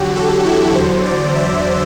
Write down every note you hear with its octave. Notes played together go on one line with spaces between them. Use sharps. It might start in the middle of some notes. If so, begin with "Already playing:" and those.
Already playing: E2 D3 F#3 F#4 G4
A4
E4
E2 D3 F#3 C5
D5
E5